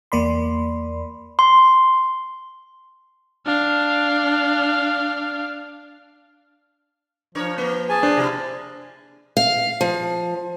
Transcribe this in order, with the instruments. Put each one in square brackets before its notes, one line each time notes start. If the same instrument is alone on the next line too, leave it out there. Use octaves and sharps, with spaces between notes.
[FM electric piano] E2 A#3 D5 B5 C6
[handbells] C6
[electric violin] D4 F5
[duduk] F3 [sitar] D4 A#4 C#5
[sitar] A#3 A#4
[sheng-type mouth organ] G#4 G#5 A5
[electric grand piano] D4 C5
[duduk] C3 [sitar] E4 A#4
[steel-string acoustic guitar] F5
F3